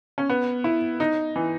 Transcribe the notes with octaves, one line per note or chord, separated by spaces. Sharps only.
C#4
B3
E4
D#4
E3